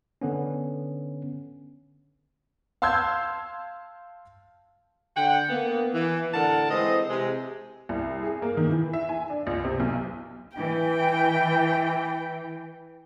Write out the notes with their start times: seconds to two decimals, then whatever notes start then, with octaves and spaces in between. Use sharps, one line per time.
0.21 D3 B3 C#4
2.82 F5 A5 C6 E6 G6 G#6
5.17 D3 F#5 G5
5.50 A#3 B3
5.94 E3
6.34 A2 D3 A4 A#4 F#5 A5
6.71 E3 G#3 C4 C5 D#5
7.09 C3 G#3
7.89 C2
8.23 G#4
8.42 A#3
8.57 D#3
8.70 E3
8.93 E5
9.09 G#5
9.30 D4
9.47 C#2
9.65 C3
9.80 B1
10.58 E3 G5